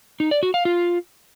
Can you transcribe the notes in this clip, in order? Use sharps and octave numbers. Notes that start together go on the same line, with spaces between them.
D#4
D5
F#4
F5
F4